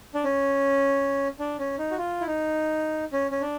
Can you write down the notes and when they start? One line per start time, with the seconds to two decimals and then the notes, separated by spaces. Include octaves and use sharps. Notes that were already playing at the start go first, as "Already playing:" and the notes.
0.15 D4
0.24 C#4
1.39 D4
1.59 C#4
1.78 D#4
1.91 F#4
1.98 F4
2.20 E4
2.27 D#4
3.13 C#4
3.31 C#4
3.41 D4